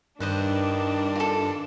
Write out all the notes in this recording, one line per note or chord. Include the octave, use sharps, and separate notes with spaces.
G2 D#3 D4 B4 C5 D#5
F4 A4